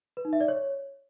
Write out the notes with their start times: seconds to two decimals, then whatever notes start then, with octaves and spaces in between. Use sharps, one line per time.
0.17 B4
0.25 D#4
0.33 E5
0.41 D5
0.48 C#5